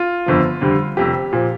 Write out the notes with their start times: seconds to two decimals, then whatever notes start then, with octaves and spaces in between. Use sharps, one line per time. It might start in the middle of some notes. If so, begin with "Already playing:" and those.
Already playing: F4
0.26 G1 F2 D3 F3
0.61 F2 D3 G3
0.97 F1 F2 F3 G4
1.33 A#2 F3